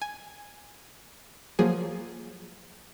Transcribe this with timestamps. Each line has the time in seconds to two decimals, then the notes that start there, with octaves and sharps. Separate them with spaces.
0.02 G#5
1.59 F3 F#3 A#3 G#4